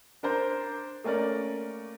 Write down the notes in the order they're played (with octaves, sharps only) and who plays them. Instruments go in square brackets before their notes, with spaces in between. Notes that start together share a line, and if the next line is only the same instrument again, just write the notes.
[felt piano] D4 A#4 C5
A3 A#3 C#4 A#4 D5